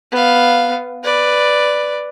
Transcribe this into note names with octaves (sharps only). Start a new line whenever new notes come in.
B3 F5
B4 D5